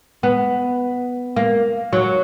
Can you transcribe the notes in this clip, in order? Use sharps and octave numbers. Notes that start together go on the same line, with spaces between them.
B3
A#3
F#3